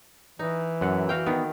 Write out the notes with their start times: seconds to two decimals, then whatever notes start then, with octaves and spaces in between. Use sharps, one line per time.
0.39 E3 D#4
0.81 F#2 F#5
1.09 F#4 F5 G5
1.27 D#3 B3